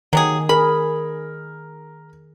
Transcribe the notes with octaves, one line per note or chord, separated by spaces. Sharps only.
D#3 F#3 G4 G#4
G#4 A#4 B5